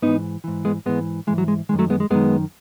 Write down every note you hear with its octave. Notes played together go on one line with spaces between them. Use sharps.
G#2 E3 B3 D#4
G#2 E3
G#3 B3
G#2 E3 G#3 B3
G#2 E3 G#3
F#3
G#3
F#2 D#3 G#3
F#3 A3
G#3 B3
G#3
F#2 D#3 G#3 B3